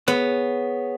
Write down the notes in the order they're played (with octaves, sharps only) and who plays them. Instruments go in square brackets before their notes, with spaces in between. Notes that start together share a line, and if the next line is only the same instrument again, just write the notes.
[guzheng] B3 [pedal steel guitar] G#4 C#5 F#6